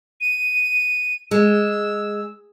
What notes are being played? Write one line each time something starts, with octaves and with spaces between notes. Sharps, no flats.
D#7
G#3 E6